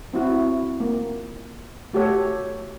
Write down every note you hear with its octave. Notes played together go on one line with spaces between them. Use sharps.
C4 E4 F#4
A#3
A3 F#4 G4 A4 C#5